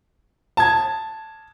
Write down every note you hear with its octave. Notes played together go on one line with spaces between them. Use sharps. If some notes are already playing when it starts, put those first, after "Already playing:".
A5 G#6